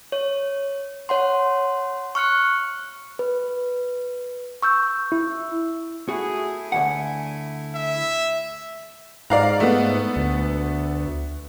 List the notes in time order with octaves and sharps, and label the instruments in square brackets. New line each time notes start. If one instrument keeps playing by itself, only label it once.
[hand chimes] C#5
C#5 F#5 C6
C#6 F6 F#6 C#7
B4
C#6 E6 G6
[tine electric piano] E4
[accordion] A3 E4 [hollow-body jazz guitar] F#4 [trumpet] G#4
[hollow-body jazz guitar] D2 F3 F#5 [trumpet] G#5
[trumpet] E5
[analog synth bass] G#2 [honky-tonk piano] D5 F5 A#5
[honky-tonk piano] A3 B3
[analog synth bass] D2